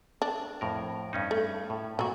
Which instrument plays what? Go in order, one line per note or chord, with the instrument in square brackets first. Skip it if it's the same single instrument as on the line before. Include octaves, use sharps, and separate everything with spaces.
[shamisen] D4
[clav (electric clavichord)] F2 A2 A#4
G2 C#4 D#4
[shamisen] A3
[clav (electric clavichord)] A2
[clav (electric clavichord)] A#2 [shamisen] F#3 F#4